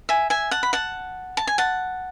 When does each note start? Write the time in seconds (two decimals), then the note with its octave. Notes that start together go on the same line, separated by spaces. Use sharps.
0.09 E5 G#5
0.30 E5 G#5
0.51 F#5 A5
0.63 B5
0.73 F#5 A5
1.37 A5
1.47 G#5
1.58 F#5 A5